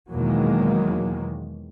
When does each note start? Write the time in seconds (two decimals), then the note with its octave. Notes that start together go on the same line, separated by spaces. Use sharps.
0.12 E2 B2 D#3 F#3 G#3 A#3